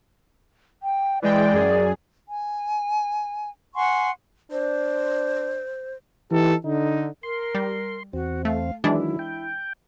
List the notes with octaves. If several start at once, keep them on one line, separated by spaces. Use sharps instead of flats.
G5
E3 G#3 D5 G5
F#2 G#4
G#5
F#5 G#5 C6 C#6
D4 C5
E3 D#4 G4 A4
D3 D#4
A#4 C6
G3
E2 C4 F#4
A3 F5
D#3 E3 F#3 G#3 D4 E4
G5